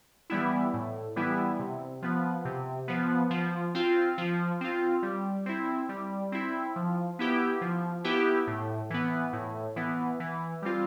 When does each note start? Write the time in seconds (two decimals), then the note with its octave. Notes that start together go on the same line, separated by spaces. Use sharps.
0.30 E3 G3 B3 E4
0.73 A2
1.16 E3 G3 B3 E4
1.59 C3
2.02 F3 B3
2.45 C3
2.88 F3 B3
3.30 F3
3.75 C4 F4
4.18 F3
4.61 C4 F4
5.03 G3
5.46 C4 E4
5.89 G3
6.32 C4 E4
6.76 F3
7.19 B3 E4 G4
7.61 F3
8.04 B3 E4 G4
8.47 A2
8.90 E3 B3
9.33 A2
9.76 E3 B3
10.20 E3
10.62 G3 C4 F4